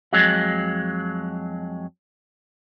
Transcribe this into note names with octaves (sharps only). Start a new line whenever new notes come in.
F2 F#3 G#3